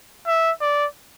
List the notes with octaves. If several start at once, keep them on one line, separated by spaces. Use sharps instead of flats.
E5
D5